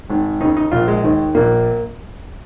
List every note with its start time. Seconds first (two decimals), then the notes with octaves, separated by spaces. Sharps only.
0.09 G#1 G#2 D#3
0.40 D#2 C#3 D#4
0.57 D#4
0.71 A#1 A#2 F4
0.88 G#3
1.04 D#2 D#3
1.35 A#1 A#2 A#3